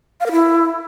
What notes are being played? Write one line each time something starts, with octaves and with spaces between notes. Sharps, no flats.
F5
A#4
E4